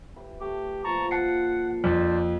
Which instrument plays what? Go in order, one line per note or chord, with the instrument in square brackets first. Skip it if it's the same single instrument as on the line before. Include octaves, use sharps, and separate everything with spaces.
[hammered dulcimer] E4 G4 B4
[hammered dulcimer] A3 [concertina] G4
[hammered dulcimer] A#2 F3 A#3 [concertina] A5 A#5 C#6
[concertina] F#5 [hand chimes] A5 C7 C#7
[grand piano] F2 [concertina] D4 C5 D5